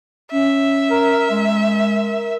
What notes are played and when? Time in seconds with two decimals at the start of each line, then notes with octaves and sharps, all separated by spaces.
0.31 C#4 E5
0.91 A#4
1.31 G#3 E6
1.75 A#4